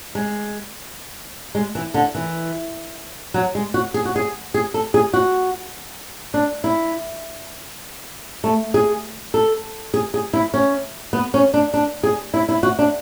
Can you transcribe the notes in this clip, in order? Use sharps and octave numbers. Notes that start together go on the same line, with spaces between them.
G#3
G#3
E3
D3
E3
F#3
G#3
F#4
G#4
F#4
G#4
G#4
A4
G#4
F#4
D4
E4
A3
G#4
A4
G#4
G#4
E4
C#4
B3
C#4
D4
D4
G#4
E4
E4
F#4
D4